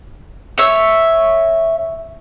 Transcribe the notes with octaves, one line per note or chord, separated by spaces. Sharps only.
C#5 E5